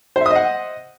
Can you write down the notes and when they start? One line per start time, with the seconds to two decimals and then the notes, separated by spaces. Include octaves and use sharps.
0.16 C5
0.21 E5
0.26 D#6
0.31 D#5
0.36 F#5